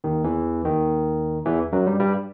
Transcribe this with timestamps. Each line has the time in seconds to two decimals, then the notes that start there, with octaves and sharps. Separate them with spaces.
0.04 D#2 D#3
0.24 E2 E3
0.64 D#2 D#3
1.46 E2 E3
1.72 F#2 F#3
1.86 G2 G3
2.00 G2 G3